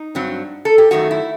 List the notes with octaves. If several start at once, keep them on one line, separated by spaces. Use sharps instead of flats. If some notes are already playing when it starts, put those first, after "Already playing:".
Already playing: D#4
G2 F#3 C4
A4
G4
F#2 D#3 A3 F#4
E4